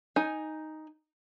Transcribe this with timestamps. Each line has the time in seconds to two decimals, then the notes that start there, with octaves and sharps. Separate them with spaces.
0.16 D#4 G#5